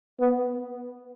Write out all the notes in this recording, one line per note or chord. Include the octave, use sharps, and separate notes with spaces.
B3